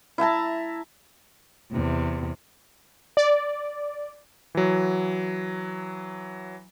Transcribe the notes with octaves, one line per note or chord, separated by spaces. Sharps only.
E4 E5 A5 A#5
E2 C3
D5
E3 F#3